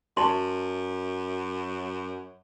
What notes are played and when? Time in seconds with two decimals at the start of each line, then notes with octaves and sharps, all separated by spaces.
0.17 F#2 A5 C6